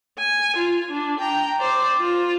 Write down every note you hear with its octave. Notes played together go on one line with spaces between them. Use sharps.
G#5
F4
D4
G5 A#5
C5 D5
F4